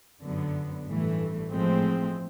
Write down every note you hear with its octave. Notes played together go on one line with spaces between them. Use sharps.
G1 F#2 D3 F#3 B3
A1 G2 E3 A3
A1 A2 F3 G#3 C4